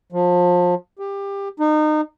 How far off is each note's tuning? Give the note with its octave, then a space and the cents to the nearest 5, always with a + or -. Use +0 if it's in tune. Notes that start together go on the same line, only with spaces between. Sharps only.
F3 +30
G4 +20
D#4 -30